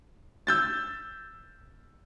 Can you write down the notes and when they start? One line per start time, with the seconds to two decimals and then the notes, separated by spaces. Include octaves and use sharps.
0.47 E6 G6 A6